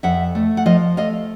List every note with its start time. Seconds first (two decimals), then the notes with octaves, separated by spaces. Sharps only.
0.03 F2 E5 F#5
0.35 A3
0.57 F#5
0.66 F3 D#5 F5
0.97 A3 D#5 F5